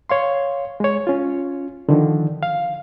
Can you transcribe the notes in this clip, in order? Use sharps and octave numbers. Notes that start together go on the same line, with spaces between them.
C#5 F5 C6
G#3 C#5
C#4 F4
D3 D#3 F3
F5